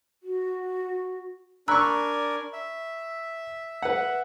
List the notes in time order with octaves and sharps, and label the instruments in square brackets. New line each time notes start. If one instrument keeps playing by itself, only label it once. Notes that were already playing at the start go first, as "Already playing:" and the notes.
[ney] F#4
[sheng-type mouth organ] D4 A#4 G#5 [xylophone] A#5 E6 F#6 [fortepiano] B5 C#6
[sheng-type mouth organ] E5
[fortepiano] B4 F#5